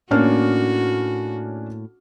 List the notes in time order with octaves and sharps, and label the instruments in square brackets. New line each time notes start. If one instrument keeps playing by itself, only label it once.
[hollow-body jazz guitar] A2 A#3 [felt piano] C#4 D4 F6 [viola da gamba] F#4